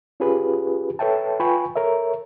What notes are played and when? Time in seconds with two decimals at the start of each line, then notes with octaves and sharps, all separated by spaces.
0.20 C#4 F4 G4 G#4 B4
0.99 A4 B4 C#5 E5 G5 A5
1.40 F4 B4 G5 G#5 B5 C#6
1.75 A4 A#4 C#5 E5